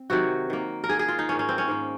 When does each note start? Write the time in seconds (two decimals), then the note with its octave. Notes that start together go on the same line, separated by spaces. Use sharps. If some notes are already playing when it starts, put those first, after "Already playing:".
Already playing: C4
0.10 C3 D#3 F#3 F#4
0.50 D#3 A#3
0.84 A#4
0.89 D#3 A#3 G#4
0.99 G#4
1.08 F4
1.19 D#4
1.29 G#2 D#3 A#3 C#4
1.39 C#4
1.49 C4
1.58 C#4
1.68 G#2 D#3 A#3